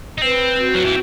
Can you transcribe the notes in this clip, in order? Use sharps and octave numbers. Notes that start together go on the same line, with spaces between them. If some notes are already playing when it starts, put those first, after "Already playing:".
D#4
C4 B4
F#4
F#3
E3